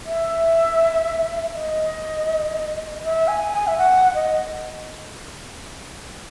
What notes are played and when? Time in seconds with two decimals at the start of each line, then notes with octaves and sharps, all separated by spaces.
0.06 E5
1.55 D#5
3.03 E5
3.28 G#5
3.52 G#5
3.67 E5
3.77 F#5
4.15 D#5